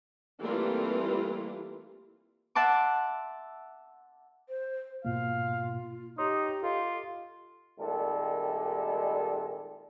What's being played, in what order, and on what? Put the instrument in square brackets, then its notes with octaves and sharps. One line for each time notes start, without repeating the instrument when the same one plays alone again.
[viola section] E3 G3 A3 A#3 C4 F4
[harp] E5 F#5 A5 C6 D6
[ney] C5
[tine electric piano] G#2 B2 A#3 [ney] F4 [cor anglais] F5
[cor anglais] D#4 [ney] G4 [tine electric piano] C#5 C6 D#6
[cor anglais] F4 [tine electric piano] A4 D#5
[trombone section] C2 A#2 D#3 G3 G#3 A4